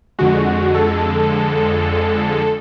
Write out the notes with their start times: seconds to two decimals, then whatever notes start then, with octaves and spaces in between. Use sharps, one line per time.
0.19 F2 D3 G#3 F#4
0.74 A4